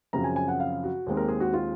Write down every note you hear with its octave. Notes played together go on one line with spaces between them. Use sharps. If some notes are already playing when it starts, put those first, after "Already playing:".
F#2 C#3 F3 C4 A#5
G#5
G#5
F#5
F5
F#4
D#2 D#3 G#3 C4
A#4
G#4
F#4
F4